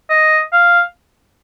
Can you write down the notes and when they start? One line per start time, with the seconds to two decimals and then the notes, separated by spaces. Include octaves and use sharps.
0.10 D#5
0.52 F5